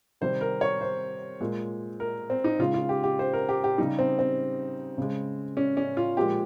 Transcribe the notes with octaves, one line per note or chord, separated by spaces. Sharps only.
C3 D#3 G3 C5
A#4
C#5
C5
A#2 G#3
A#4
C4
D#4
C#3 G#3 F4
F4
G4
G4
C5
A#4
G4
G4
C#3 G3 D#4
C4
C4
C#3 G#3
C#4
C#4
F4
A#2 F3 G#3 G4